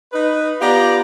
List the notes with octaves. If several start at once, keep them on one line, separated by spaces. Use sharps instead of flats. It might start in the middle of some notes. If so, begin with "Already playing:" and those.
D#4 B4
B3 F4 G4 D5 A#5